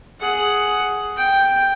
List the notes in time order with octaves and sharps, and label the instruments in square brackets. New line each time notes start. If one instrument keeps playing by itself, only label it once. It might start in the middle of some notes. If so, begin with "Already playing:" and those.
[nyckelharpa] G#4 F#5
G5